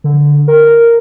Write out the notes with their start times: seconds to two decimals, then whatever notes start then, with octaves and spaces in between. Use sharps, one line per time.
0.04 D3
0.48 A#4